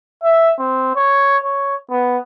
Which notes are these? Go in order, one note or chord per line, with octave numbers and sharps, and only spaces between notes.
E5
C4
C#5
C#5
B3